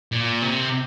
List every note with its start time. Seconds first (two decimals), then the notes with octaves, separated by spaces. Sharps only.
0.12 A#2
0.42 C3